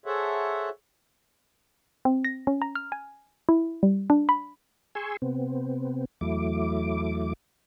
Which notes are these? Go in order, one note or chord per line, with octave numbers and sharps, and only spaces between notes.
G#4 A4 C5 C#5 E5 F#5
C4
A#6
C#4
A#5
F6
G#5
E4
G3
D4
B5
G#4 G#5 C6 C#6 E6
C3 B3 C4
E2 F#3 A3 E4 D6